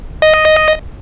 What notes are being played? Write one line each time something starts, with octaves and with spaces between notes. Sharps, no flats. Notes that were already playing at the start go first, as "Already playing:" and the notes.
D#5